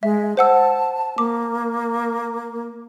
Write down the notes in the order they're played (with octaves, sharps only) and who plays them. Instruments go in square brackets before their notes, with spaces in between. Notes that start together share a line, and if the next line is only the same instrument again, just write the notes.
[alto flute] G#3 [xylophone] E5
[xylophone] C5 F#5 E6 [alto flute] A5
[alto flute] A#3 [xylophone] D6